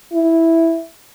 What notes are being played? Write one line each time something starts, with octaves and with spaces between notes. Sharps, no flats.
E4